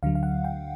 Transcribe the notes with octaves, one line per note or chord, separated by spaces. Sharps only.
D2 D3 F#3 F5
F5
F#5
G5